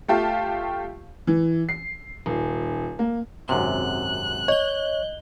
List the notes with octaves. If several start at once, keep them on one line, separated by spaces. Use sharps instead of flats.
A3 F4 G4 F5 A5
E3
C7
D#1
A#3
G#1 F#2 C3 F#6
C#5 D#5 G7